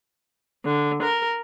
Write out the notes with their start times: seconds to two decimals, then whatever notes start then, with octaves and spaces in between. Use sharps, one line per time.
0.65 D3
1.03 A#4